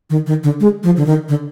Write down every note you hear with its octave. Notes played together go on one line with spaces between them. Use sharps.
D#3
D#3
D3
G#3
F3
D3
D#3
D3